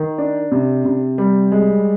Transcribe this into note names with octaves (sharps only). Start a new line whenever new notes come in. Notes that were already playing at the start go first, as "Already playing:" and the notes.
Already playing: D#3
D4
C3
C3
G3
G#3